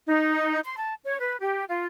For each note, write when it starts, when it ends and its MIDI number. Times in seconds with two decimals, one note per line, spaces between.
0.08 0.60 63
0.64 0.77 84
0.77 0.95 81
1.03 1.19 73
1.20 1.37 71
1.41 1.64 67
1.68 1.87 65